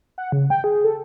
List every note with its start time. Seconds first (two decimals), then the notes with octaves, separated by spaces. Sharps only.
0.18 F#5
0.32 C#3
0.50 G5
0.64 G#4
0.84 A4